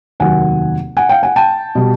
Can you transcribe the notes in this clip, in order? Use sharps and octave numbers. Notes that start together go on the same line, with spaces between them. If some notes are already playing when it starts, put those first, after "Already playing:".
F1 D#2 D#3 F#3 A#3 F#5 G#5
F#5 G#5
F5 G5
F#5 G#5
G5 A5
B2 G3